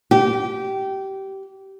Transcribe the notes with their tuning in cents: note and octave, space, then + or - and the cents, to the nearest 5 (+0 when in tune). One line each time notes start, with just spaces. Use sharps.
G4 -20